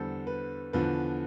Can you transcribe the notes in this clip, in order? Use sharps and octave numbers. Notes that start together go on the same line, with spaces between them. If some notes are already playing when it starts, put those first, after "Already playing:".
Already playing: E2 D3 G3 A4 C5
B4
E2 D3 F3 B4